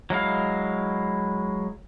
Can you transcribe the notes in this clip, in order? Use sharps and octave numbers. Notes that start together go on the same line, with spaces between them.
F#3 G#3 E4 F5